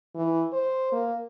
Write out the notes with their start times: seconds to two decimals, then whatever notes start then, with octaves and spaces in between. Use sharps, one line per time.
0.15 E3
0.53 C5
0.92 A#3